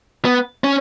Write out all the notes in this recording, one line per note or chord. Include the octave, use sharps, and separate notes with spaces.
B3
C#4